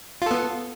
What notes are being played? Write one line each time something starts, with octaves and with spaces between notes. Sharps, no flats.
B3 F4 A4